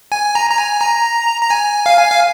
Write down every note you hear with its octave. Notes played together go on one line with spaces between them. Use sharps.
G#5
A#5
A#5
G#5
A#5
A#5
G#5
F5
G#5
F5